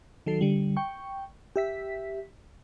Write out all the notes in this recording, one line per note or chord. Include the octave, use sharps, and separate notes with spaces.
D#3 F#3 A4 C7
D3 G3
G5 C#6
G4 E5 B6